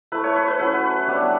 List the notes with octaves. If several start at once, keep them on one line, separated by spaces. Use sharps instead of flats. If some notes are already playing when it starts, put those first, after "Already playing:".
A3 E4 B4
C#5
B4
B4
F#3 C#4 E4 B4
G3 B3 D4